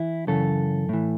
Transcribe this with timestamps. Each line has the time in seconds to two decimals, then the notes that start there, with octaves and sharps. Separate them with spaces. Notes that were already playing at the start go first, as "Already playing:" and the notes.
Already playing: E3 E4
0.27 F#2 C#3 E3 A4
0.89 A2 E3